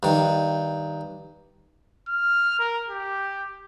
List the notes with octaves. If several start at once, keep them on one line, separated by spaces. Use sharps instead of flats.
G2 D#3
F6
A#4
G4